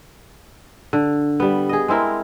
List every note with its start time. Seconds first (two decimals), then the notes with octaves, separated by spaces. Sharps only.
0.93 D3
1.40 G3 B3
1.69 G#4 D#5
1.88 G#3 C4 E4 A#4